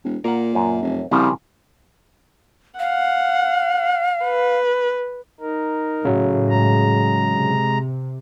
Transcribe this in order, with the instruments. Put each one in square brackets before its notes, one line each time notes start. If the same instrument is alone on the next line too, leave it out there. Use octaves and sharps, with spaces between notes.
[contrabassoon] E1
[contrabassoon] A#2 [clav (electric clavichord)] A#4 F#5
[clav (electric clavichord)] F#2
[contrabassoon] F1
[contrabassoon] C2 [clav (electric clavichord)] C#3 F3 G3
[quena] F5 [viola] F#5
[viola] B4
[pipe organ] D#4 A#4
[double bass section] A2 [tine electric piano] C#3 F#3
[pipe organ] G#3 A#5
[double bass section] C3